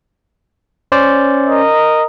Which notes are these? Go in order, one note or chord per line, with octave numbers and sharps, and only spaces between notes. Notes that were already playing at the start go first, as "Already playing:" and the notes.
C#4 C5 D5
A#4 D#5